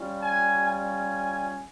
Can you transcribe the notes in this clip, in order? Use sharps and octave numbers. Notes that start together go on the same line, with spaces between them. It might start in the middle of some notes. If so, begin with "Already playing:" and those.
Already playing: G3 C#4 F4
G#5
G#5